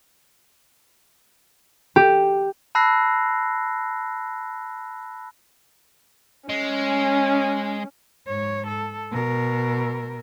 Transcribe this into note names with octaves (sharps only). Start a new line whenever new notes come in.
G4
A5 B5 E6 F#6 A#6 C7
G#3 C#4
G#2 C#5
A4
B2 A#4